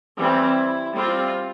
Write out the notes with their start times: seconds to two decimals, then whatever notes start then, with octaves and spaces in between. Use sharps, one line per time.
0.17 E3 G3 C4 E4
0.93 G3 C4 F4